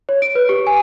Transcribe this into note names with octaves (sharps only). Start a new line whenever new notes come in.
C#5
D7
B4
G4
G#5